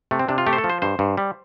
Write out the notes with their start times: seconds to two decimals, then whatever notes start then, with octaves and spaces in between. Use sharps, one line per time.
0.11 C3 A3
0.19 C4
0.29 C3 D4
0.38 F4
0.46 A3 G4
0.53 C5
0.58 A4
0.64 F3
0.70 C5
0.82 G2 C5
0.99 G2
1.17 G3